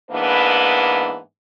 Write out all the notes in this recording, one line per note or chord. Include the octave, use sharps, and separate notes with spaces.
G#2 E3 A#3 B3 D4 B4